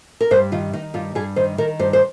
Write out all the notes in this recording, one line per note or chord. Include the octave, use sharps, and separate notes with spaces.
A#4
G2 C5
D#3 F4
D#3 D#4
G2 F4
G2 G#4
D#3 C5
D#3 A#4
G2 C5
C5